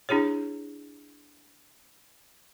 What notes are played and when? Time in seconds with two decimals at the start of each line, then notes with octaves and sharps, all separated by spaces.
0.09 D4 E4 G4 G#4 C#5